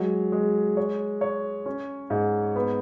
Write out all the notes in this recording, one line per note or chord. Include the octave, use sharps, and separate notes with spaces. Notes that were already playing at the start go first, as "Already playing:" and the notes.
Already playing: F#3 G#3
G#3
C#5
C#5
C#4
G#2
B3